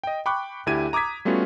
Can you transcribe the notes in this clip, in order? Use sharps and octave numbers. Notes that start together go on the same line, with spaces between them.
D#5 G5
G5 B5 C#6 D6 F#6
D2 D4 E4 G4 G#6 D#7
A#5 D6 D#6 G#6 B6
G3 A3 B3 C#4 F4 F#4